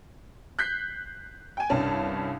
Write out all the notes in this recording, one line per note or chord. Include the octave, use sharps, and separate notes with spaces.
F#6 G6 B6 C7
G5 G#5
C2 G2 C#4 A5